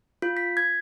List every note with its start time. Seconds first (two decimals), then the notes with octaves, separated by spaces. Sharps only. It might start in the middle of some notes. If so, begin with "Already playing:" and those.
0.22 F4
0.37 B6
0.57 G#6